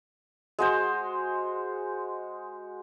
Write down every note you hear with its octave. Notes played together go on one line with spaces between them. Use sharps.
G#3 F#4 C5